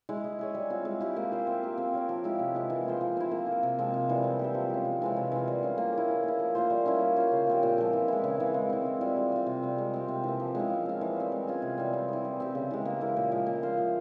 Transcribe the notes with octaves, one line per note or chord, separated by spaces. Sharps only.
G#3 E4
G#3
E4 G#4 C#5
G3
C4 F4
G#3
E4 G4
A#3
F4 C5 E5
C4
G4 A#4
C4
F4 A#4 C#5
F3
G#3 E4 G4
C3
F3 G#3 E4
E3
A#3 F4 C5
F3
C4 E4
A#3
F4 A#4
C3
F3 G#3 C4
C3
E3 G3
C4
G4 C5 E5
F3
G#3 C#4
C3
E3 G#3 C4
C3
E3 A#3 F4
G3
C#4 F4
A#3
E4 G#4
E3
A#3 E4
F3
A#3 F4 C5
G3
C#4 E4
A#3
F4 C5 F5
C#3
F3 C4 G4
A#2
F3 G#3 E4
E3
G#3 E4
C#3
E3 G#3 C4
G#3
C4 E4
E3
G3 C4 F4
G3
C4 F4
C3
G3 C4
G#3
C4 G4
C3
E3 A#3
F3
G#3 C#4 E4
F3
C4 F4
E3
G3 C4
G#3
C#4 F4 G#4
C3
E3 G3 C4
C4
E4 G#4
G3
C4 G4
C#3
E3 G#3
A#3
E4 G4 A#4
A#2
F3 G#3 E4
A#3
F4 C5 F5
F3